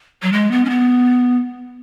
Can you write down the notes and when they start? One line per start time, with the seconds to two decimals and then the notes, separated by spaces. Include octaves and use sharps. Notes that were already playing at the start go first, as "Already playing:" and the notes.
0.22 F#3
0.32 G#3
0.51 B3
0.65 C#4
0.70 B3